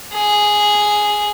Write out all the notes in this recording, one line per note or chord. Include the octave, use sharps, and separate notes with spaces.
G#4